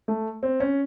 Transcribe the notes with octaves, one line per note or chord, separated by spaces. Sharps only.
A3
C4
C#4